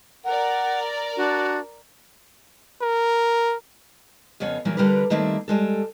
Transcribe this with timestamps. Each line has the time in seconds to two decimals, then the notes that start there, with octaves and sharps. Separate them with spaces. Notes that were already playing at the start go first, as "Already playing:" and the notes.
0.25 A#4 D5 F#5
1.17 D4 F#4
2.82 A#4
4.40 F2 C#3 B3 C#5 F5
4.65 A#2 E3 F#3 G3 A#3
4.77 D3 G3 G4 A#4 B4
5.10 D#3 G3 A3 A#3 C4 E4
5.48 G3 G#3 A4